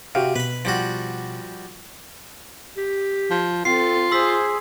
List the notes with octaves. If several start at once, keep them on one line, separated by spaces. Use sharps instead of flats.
C3 F#4 G4 F5
B2 B4 B5
F3 G3 F#4
G4
F3
C4 F4 A4 C7
G#4 C5 C6 E6 B6